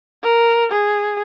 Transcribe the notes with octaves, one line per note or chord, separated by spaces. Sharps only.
A#4
G#4